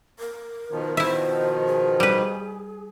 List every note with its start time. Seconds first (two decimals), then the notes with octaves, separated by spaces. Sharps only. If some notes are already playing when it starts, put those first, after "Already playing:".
0.19 A#4
0.71 B2 D#3 F3
0.97 E4 C5 E5
1.67 G#4
2.00 G3 B4